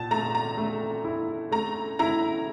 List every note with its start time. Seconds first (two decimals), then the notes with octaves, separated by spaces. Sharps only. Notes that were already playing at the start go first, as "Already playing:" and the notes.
Already playing: A#2 A5
0.11 A3 A#5
0.35 A#5
0.58 A3
1.04 E4
1.52 A3 A#5
1.99 E4 A#5